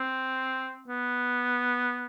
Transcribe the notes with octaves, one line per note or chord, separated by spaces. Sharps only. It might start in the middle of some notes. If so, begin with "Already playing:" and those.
Already playing: C4
B3